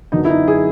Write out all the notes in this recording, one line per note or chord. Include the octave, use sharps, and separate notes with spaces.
F#2 D3 F#3 B3 D#4
E4
D#4
G#4